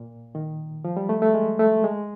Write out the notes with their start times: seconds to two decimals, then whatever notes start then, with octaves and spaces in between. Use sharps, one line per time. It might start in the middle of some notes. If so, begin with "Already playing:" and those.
Already playing: A#2
0.35 D#3
0.85 F3
0.97 G3
1.09 A3
1.22 A3
1.34 G#3
1.59 A3
1.84 G#3